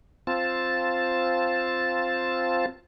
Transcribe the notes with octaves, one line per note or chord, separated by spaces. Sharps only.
C4 F4 A5